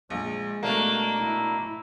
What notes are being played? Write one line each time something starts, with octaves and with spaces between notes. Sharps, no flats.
A#1 G#3
B2 A3 A#3 D4
E4